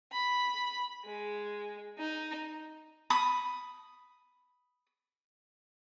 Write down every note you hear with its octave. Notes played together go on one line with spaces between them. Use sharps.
B5
G#3
D#4
B5 D#6